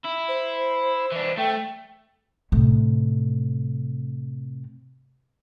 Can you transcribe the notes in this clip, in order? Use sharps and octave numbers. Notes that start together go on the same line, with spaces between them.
E4
C5
E3 D4
A3 G5
A2 C3